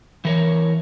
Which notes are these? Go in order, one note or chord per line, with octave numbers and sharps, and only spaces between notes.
E3 A#4 C#5